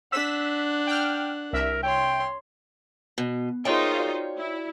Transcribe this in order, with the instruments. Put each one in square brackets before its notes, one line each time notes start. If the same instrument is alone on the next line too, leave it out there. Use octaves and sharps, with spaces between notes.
[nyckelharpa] D4 F#5 [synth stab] E6 B6 E7
[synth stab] G5 F6
[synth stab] C2 E5 [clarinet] A#4
[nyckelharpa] C#5 C6 [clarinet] G5
[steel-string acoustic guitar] B2
[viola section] D#4 F4 C5 [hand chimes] G#4 A#4 E5 [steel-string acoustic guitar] C#5 G5
[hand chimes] F#4 D5
[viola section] E4